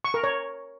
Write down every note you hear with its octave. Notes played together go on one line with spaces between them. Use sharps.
C#6
A#4
C#5